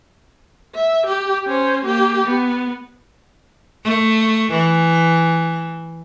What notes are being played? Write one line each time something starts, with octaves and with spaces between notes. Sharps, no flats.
E5
G4
C#4 C5
A#3 G4
B3
A3
E3